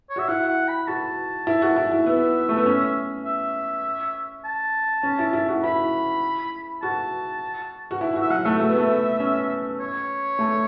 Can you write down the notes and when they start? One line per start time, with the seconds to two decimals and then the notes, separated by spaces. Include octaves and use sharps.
0.10 C#5
0.16 F#4 E5
0.28 E4 F#5
0.48 F#5
0.68 B5
0.87 F#4 A5
1.47 E4
1.62 F#4
1.76 E4
1.91 E4
2.06 B3 E5
2.49 A3
2.57 B3
2.66 C#4
3.25 E5
4.45 A5
5.03 C#4
5.19 E4
5.33 E4
5.48 F#4
5.63 E4 B5
6.82 F#4 A5
7.91 F#4
8.01 E4
8.16 F#4
8.22 E5
8.30 F#3 F#5
8.45 A3 E5
8.60 A3
8.69 B3
8.78 A3
9.20 C#4
9.79 C#5
10.39 A3